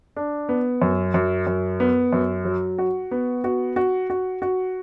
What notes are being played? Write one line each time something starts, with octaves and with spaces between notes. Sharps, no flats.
D4
B3
F#2
F#2
F#2
B3
F#2
F#3
F#4
B3
F#4
F#4
F#4
F#4